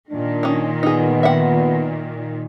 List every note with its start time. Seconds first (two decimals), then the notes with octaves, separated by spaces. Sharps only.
0.11 A#2 D#3 D4
0.43 C#4 D#4
0.83 B3 D#4 G#4
1.23 E5 F#5